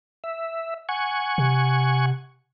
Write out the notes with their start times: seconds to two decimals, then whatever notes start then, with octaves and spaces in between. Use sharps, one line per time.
0.24 E5
0.89 F#5 G#5 C#6
1.38 C3